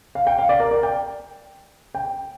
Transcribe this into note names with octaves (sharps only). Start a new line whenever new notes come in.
F5
G5
F5
D5
A#4
D5
G5
G5